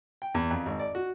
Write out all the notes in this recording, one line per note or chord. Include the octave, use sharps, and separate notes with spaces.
G5
E2
F2
G#1
D5
F#4